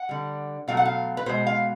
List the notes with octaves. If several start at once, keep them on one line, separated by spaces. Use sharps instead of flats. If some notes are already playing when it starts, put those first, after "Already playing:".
Already playing: F#5
D3 G3
B2 F#3 A3 F5
F#5
F5
B4
B2 G#3 C5
F5